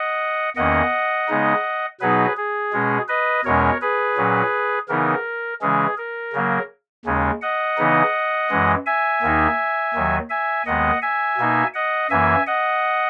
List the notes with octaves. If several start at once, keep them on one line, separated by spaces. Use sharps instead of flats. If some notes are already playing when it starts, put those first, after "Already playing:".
Already playing: D#5 F#5
E2 D#3 A#3 C#4 D#5 F#5
C#3 G#3 B3 D#4
B2 F#3 B3 D#4 G#4 B4
G#4
B2 G#3 C#4
B4 D#5
E2 B2 G#3 C#4 A#4 C#5
G#4 B4
A#2 F#3 C#4
C#3 E3 B3 D#4 A#4
C#3 E3 G#3 C#4 G#4
A#4
C#3 F#3 A#3
D#2 C#3 G#3 C#4
D#5 F#5
C#3 E3 B3 D#4
F#2 E3 G#3
E5 G#5
D#2 D#3 A#3 D#4
D#2 D#3 F#3
E5 G#5
D#2 D#3 G#3 B3 D#5 F#5
E5 G#5
B2 A#3 D#4
D#5 F#5
F#2 E3 A#3 E5 G#5
D#5 F#5